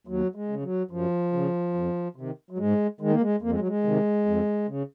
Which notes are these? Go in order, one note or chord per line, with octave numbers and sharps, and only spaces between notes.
D#2 F#3
G#3
C#3
F#3
F#2 F3
C#3
F2
C3 D#3
F#3
G#2 G#3
D#3 G#3
A#3
G#3
F2 A#3
G#3
F#3
G#3
C3 D#3
F2
C#3